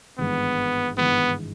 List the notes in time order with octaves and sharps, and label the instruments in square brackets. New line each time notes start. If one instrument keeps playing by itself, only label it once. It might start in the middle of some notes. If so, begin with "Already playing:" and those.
[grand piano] G#1 G2 E3 G#3 [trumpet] B3
[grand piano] G#1 G2 E3 G#3 [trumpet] B3